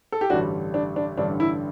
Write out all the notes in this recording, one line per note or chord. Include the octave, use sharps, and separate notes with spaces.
A4
G4
A1 G2 D3 G3 D4 F#4
D4
D4
A1 G2 D3 G3 D4
E4